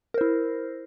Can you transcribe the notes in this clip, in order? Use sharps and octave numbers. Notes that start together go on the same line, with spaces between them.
E4 A#4 C5